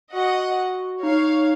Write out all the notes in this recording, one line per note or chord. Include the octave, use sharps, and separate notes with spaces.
F#4 D#5 F#5
D#4 C#5 F5